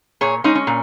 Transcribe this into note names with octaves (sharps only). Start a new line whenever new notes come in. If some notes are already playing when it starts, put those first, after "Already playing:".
A#2 G#4 C#5
G#3 C#4 D#4
C#4
A#2